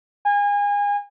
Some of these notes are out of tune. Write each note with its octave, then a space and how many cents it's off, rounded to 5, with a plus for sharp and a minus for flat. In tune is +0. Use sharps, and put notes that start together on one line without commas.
G#5 -30